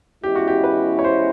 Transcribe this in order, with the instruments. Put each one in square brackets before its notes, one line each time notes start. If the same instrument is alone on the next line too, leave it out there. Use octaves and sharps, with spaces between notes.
[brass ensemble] E2 B2 G#3 C#4 E4 [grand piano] G4
[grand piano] F#4
G4
B4
C#5
C5